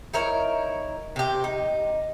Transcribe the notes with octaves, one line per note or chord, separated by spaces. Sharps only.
D#4 E4 A#4 C#5
C3 G4
D#4